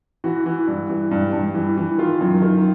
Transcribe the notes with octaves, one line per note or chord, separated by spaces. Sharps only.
E3 F#4
E3
G2
E3
G2
G2
E3
E3
D#3 F4
F#2
D#3